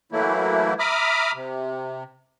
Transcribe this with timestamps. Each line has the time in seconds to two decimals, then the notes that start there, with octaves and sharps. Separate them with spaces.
0.12 E3 F#3 A3 A#3 E4
0.79 E5 A#5 B5 D6 D#6 F6
1.35 C3